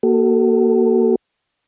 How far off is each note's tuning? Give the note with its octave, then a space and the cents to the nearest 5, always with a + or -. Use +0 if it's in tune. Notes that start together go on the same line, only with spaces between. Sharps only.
A#3 +5 F#4 +35 A4 +15